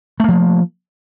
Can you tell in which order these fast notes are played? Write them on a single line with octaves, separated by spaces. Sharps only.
A3 A#3 F3